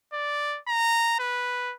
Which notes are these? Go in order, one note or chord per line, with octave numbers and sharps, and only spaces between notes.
D5
A#5
B4